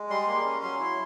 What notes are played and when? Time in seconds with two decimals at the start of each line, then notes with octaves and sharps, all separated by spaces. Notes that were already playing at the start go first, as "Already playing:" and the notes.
Already playing: G#3
0.10 G3 C6
0.27 A#3
0.45 C#4
0.62 F#3 C6
0.79 E4